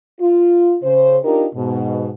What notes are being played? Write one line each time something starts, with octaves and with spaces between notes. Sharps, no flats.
F4
C#3 C5
D4 D#4 F4 G4 A#4
G#2 B2